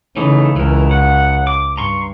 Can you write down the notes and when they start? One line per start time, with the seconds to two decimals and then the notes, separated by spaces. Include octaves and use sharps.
0.17 C#3 E3 A3 D#4
0.56 C#2 E3 A#4
0.91 F#5
1.47 D6
1.77 G2 A#5 C6 C#6